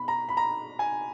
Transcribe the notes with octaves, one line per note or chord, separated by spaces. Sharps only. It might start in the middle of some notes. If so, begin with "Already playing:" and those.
Already playing: B2 B5
A#5
B5
A#5
G#5